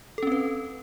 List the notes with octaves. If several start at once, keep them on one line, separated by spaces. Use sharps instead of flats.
C4 C#4 A4 B4